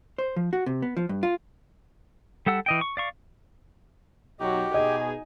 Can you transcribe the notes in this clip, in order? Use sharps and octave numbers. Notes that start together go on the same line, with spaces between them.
C5
F3
F#4
C3
B3
F3
G2
F4
G3 A4 F#5 E6
E3 D#5 G5
C#6
D5 F5 C#6
B1 F#3 D#4 F#4 G4
B2 D#4 G#4 D#5 G#5